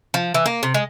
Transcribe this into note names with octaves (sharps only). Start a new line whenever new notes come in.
F3
E3
A#3
C3
G#3